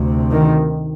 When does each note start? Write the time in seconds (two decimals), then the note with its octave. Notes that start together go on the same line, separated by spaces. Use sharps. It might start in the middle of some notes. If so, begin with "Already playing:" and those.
Already playing: D2 C3
0.31 D#3